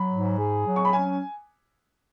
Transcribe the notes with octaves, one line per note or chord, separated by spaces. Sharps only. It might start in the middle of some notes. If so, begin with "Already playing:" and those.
Already playing: F#3 B5
G#2
G#4
F#3
C#6
B5
C#4 G#5